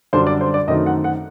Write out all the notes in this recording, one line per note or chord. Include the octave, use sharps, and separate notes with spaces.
F#2 D3 G3 D4 C5
D5
C5
D5
F#2 D#3 A3 C4 D#4 D#5
F#5
F#5